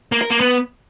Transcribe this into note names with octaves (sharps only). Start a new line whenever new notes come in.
A#3
A#4
A#3
B3